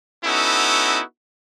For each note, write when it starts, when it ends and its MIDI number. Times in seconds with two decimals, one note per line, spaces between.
0.25 1.01 59
0.25 1.01 61
0.25 1.01 63
0.25 1.01 64
0.25 1.01 66
0.25 1.01 69